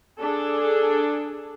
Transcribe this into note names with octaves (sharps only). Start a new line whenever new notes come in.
D4 G#4 A4